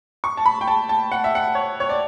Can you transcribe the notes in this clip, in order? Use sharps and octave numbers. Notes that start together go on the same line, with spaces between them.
C#6
A5
B5
G5
A5
A5
F#5
E5
F#5
C#5
C#5
D5